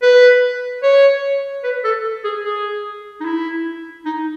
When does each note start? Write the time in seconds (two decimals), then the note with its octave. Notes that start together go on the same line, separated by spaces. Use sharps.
0.02 B4
0.83 C#5
1.64 B4
1.84 A4
2.24 G#4
2.44 G#4
3.21 D#4
3.25 E4
4.06 D#4